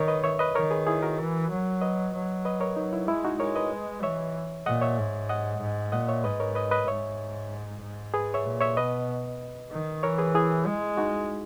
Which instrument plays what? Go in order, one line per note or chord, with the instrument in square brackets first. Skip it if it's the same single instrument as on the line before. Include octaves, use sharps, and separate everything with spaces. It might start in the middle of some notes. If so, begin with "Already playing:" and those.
Already playing: [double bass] D#3 [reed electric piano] A#4 C#5
[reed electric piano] B4 D#5
C#5 E5
B4 D#5
[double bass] D#3 [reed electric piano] A#4 C#5
[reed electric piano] G#4 B4
E4 G#4
F#4 A#4
[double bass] E3
F#3
[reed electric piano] B4 D#5
[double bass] F#3
[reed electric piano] B4 D#5
A#4 C#5
[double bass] F#3 [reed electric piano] D#4
[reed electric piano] E4
[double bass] G#3 [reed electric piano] E4
[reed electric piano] D#4 F#4
[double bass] G#3 [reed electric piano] A#4 C#5
[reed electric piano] B4 D#5
[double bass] E3 [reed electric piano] C#5 E5
[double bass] A#2 [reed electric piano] D#5 F#5
[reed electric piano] C#5 E5
[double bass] G#2
[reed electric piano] D#5 F#5
[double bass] G#2
[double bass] A#2 [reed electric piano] D#5 F#5
[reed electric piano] C#5 E5
[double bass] G#2 [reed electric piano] B4 D#5
[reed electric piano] A#4 C#5
B4 D#5
B4 D#5
[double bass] G#2 [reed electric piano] C#5 E5
[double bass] G#2
[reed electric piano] G#4 B4
C#5 E5
[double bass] A#2
[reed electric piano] C#5 E5
[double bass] B2 [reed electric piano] B4 D#5
[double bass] D#3
[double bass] E3 [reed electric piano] A#4 C#5
[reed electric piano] G#4 B4
E4 G#4
[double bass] G#3
[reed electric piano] D#4 F#4